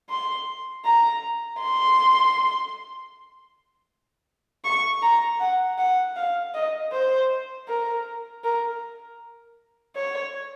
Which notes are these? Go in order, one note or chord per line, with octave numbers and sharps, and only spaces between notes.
C6
A#5
C6
C#6
A#5
F#5
F#5
F5
D#5
C5
A#4
A#4
C#5